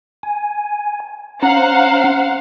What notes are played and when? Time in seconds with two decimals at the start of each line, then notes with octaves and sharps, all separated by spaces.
0.23 G#5
1.42 C#4 C5 F5 F#5 A#5